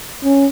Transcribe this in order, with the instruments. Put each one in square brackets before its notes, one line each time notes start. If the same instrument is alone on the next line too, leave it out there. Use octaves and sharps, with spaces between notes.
[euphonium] C#4